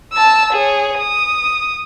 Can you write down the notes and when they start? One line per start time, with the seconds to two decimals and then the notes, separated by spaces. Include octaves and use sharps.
0.13 A5 E6
0.53 G#4 C#5
0.98 D#6